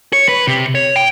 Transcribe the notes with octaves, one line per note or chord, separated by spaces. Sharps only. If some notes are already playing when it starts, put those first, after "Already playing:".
C#5
B4
C3
C#5
G5